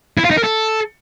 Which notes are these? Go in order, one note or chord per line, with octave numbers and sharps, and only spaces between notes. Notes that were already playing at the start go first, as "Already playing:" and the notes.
E4
F4
D#4
A#4
A4